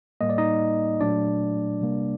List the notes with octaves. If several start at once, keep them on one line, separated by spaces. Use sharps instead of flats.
A2 G3 A#3 D#5
D5
D#4 D#5
A#2 F#3 A3 D4 D5
C3 G3 A#3